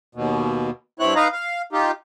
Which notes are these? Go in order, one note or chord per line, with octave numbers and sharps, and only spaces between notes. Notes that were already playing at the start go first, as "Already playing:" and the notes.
D#2 B2
G2 C4 E4 C#5 F#6
D#4 B4 D#5 F5 A#5
F5
D#4 F4 G4